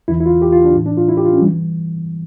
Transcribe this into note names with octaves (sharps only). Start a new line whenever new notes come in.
E2 E3 E4
E4
F4
G4
F4
D4
A2 E3
D4
F4
E4
G4
F4
C#4
E3 G3